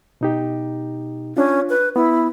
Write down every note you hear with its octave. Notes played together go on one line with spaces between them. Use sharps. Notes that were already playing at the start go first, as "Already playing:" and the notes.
B2 D#4 G4
C#4 D4 F4
B4
B3 E4